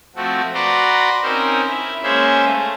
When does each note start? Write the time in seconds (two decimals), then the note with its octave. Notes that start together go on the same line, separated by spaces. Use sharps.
0.16 F3 A3 C4 F#4
0.54 F#4 B4 D5 A#5 C6
1.23 C4 C#4 D#4 A#4 C5
1.67 E4
2.03 G#3 A#3 C#4 G#4 C5 E5
2.45 A3